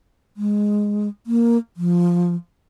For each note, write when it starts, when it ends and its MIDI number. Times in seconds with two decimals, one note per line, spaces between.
0.37 1.08 56
1.27 1.58 58
1.77 2.35 53